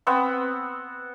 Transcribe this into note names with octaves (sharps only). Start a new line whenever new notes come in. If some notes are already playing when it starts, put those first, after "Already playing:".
B3 C4 F#5 E6